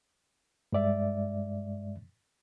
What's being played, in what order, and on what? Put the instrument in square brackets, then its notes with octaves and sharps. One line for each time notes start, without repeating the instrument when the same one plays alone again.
[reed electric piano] G2 G#3 D5 E5